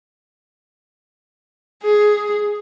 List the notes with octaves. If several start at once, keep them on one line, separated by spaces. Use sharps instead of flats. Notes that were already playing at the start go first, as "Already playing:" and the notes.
G#4